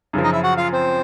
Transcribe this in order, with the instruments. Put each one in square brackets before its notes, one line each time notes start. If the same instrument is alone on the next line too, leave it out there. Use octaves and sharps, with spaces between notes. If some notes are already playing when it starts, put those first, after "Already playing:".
[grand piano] F#2 C#3 F3
[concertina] D#4 D#5
E4 E5
F#4 F#5
F4 F5
C4 C5